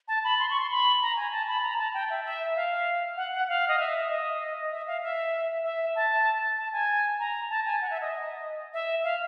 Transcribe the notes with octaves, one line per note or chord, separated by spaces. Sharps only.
A5
B5
C6
C#6
C6
B5
A#5
G#5
A5
B5
A#5
A5
G5
E5
E5
F5
F#5
F#5
F5
D#5
E5
D#5
E5
F5
E5
E5
A5
A5
G#5
A#5
A5
G#5
F#5
E5
D#5
E5
F5